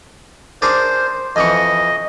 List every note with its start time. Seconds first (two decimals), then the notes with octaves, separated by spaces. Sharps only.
0.62 D4 G#4 A#4 C5
1.36 F2 E3 D#5 C#6